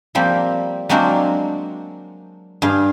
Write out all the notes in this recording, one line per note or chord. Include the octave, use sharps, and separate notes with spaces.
F3 G3 A#3 C4
F#3 G#3 A#3 C4 D4 F#4
G2 G#4 F5